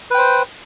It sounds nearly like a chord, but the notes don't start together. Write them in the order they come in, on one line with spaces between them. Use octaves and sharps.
B4 G5 C5